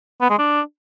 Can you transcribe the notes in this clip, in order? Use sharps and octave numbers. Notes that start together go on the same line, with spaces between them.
B3
G#3
D4